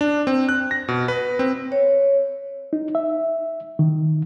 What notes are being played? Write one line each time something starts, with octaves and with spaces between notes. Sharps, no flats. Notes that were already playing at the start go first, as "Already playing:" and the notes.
D4
C4
F#6
A#6
B2
B4
C4
C#5
D#4
E5
D#3